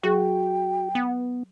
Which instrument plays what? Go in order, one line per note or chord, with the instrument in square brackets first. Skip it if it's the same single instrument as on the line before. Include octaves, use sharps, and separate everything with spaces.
[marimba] F#3 G#4 [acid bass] F#4 [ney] G5
[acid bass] B3